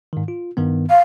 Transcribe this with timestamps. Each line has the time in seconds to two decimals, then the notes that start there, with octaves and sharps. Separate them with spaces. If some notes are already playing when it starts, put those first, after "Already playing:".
0.13 G#2 D#3
0.28 F4
0.57 G2 D#3 B3
0.90 F5